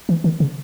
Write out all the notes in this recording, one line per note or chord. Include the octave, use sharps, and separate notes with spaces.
E3
D#3
C#3